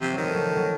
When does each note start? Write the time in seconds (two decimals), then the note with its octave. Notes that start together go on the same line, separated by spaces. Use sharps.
0.01 C3 F3
0.13 D#3 F#3
0.23 A3
0.34 F#3
0.46 A3
0.56 F#3